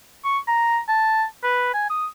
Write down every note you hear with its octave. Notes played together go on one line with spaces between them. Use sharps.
C#6
A#5
A5
B4
G#5
D#6